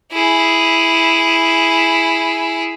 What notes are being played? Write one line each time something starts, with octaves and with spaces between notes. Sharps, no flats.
E4 G#4